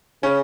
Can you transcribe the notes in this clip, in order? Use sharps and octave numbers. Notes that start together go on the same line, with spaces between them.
C#3 C#4